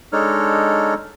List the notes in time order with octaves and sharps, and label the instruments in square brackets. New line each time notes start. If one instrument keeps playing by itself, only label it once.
[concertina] G#3 D4 D#4 A4 C#5 F6